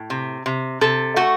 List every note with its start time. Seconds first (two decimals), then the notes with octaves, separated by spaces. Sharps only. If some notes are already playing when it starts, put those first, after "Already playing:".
Already playing: A2
0.10 C3
0.46 C3
0.81 C3 A4
1.16 A3 F#4